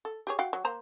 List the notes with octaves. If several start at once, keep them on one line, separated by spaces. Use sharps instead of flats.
A4
G4 G#4 C#5
F#4 F5 G5
F#3
A#3 C5 A#5